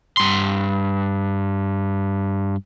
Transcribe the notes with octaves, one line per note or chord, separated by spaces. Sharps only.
G2 C6